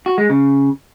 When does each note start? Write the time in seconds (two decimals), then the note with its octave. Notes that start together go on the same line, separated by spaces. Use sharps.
0.06 F#4
0.18 G#3
0.30 C#3